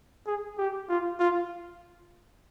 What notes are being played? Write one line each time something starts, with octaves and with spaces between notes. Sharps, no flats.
G#4
G4
F4
F4